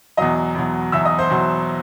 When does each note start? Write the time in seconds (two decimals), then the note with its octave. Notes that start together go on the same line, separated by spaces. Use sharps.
0.17 E2 B2 F#3 D#5 D#6
0.55 E2 B2 F#3
0.92 E2 B2 F#3 E5 E6
1.05 D#5 D#6
1.19 C5 C6
1.30 E2 B2 F#3